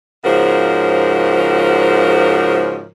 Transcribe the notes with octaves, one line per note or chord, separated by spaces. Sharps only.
G#2 C#3 F3 F#4 A#4 C#5